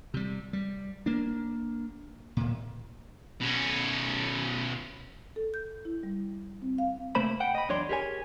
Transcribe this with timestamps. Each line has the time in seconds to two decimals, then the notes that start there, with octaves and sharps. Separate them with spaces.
0.14 C3 G3
0.53 G3
1.06 A#3 D4
2.37 D1 A#2
3.41 B2 C#4
5.36 A4
5.54 G6
5.85 E4
6.03 G3
6.62 C4
6.78 F5
7.15 C3 A3 A#3 C5 B5
7.40 F#5 G5
7.55 D#5 B5
7.69 E2 F#3 D4 C#5 D5 C6
7.89 G4 G#4 A#4 C#5 G#5